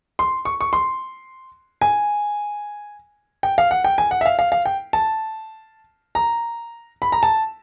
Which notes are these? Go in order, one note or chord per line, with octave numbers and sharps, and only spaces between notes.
C6
C#6
C#6
C6
G#5
G5
F5
F#5
G5
G#5
F#5
E5
F5
F5
F5
G5
A5
A#5
B5
A#5
A5